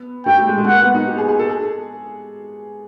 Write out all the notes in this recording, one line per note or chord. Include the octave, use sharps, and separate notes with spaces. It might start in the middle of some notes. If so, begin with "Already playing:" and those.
Already playing: B3
A3 G5
G3
G#3
G#3
A3
A#3 F#5
B3
D#4
G4
G#4
G#4
A4
G#4